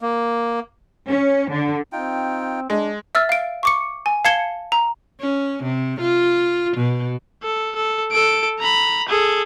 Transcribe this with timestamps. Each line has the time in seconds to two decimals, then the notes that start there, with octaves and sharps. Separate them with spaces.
0.01 A#3
1.08 C#4
1.50 D3
1.92 C4 D#4 F4 G5
2.70 G#3 D4
3.15 E5 E6 F6 A6
3.29 F5 D7
3.63 C#6 D6 C#7
4.06 G#5
4.25 F5 A5 G#6 C#7 G7
4.72 A#5
5.20 C#4
5.64 C3
6.01 F4
6.77 B2
7.43 A4
7.76 A4
8.12 A4 D7
8.60 A#5 B5
9.09 G#4 A4